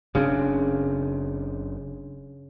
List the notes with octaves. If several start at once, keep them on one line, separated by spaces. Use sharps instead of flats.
F#1 C#3 C4 D4